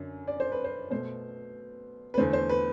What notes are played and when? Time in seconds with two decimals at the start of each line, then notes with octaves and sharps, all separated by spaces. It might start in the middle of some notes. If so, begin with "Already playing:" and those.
Already playing: F#2 D3
0.28 D5
0.40 C5
0.52 B4
0.64 C5
0.91 B2 A3 C5
2.14 B4
2.18 E2 D3 A3 C5
2.33 C5
2.49 B4